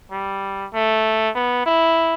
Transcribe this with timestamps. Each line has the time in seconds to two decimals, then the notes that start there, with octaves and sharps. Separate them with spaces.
0.11 G3
0.74 A3
1.35 B3
1.66 E4